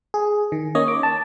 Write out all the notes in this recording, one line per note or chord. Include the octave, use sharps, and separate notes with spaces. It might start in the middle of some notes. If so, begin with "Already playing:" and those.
G#4
D#3
A#3 C#4 C#5 D#5
D6
A5